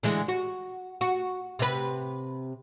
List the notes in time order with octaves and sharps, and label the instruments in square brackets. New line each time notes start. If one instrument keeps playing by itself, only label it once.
[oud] D3 E3 G#3
F#4
F#4
C3 B4